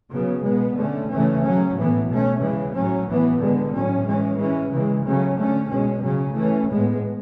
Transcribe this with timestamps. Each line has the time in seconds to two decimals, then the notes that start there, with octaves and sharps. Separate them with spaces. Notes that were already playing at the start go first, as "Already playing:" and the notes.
0.13 C#3 F#3 B3
0.45 B2 G#3 B3
0.77 D3 A3 C#4
1.11 C#3 E3 A3 C#4
1.44 C#3 F#3 C#4
1.77 A2 E3 B3
2.09 B2 A3 C#4
2.42 C#3 E3 G#3
2.75 A2 F#3 C#4
3.08 A2 E3 B3
3.40 D3 G#3 B3
3.74 A2 F#3 C#4
4.07 E3 G#3 C#4
4.39 E3 G#3 C#4
4.72 C#3 E3 G#3
5.05 C#3 F#3 A3 C#4
5.38 D3 A3 C#4
5.70 B2 G#3 C#4
6.04 C#3 F#3 C#4
6.36 E3 A3 C#4
6.69 A2 G#3 B3